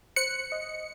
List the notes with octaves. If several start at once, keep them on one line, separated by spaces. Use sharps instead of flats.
C5 F#6 C#7
D#5